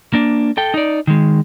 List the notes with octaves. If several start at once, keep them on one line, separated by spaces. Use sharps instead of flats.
A#3 D4
A4 G5
D#4 D5
D#3 G#3